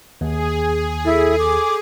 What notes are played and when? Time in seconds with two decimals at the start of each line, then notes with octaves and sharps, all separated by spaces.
0.21 D#2 G#4
1.05 E4 A4
1.39 D6